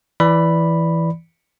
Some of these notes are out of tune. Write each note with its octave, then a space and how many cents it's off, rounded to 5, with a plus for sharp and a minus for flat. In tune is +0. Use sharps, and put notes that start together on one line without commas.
E3 +0 D5 -5 B5 +0